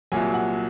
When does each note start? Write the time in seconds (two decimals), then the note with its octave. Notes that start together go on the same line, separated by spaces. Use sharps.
0.12 C2 A#2 F#3 G#5
0.34 F#5